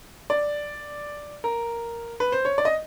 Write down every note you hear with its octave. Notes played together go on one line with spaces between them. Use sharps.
D5
A#4
B4
C5
C#5
D5
D#5